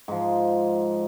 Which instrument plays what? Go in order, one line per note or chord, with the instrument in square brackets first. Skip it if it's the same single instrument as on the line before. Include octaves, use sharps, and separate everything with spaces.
[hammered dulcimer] G#2 F3